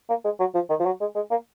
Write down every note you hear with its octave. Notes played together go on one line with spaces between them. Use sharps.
A#3
G#3
F#3
F3
D#3
F3
F#3
G#3
G#3
A#3